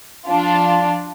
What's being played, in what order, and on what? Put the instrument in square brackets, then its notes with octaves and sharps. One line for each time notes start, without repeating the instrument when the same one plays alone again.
[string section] F3 D4 F4